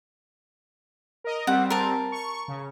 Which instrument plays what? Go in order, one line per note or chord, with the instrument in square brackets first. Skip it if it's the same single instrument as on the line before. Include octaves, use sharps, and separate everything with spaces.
[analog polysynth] A#4 D#5
[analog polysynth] G3 C4 [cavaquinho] F#5
[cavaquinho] A#4 A5
[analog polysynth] C#6
C#3